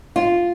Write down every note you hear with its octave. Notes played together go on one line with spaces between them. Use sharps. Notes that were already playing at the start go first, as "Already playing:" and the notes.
F4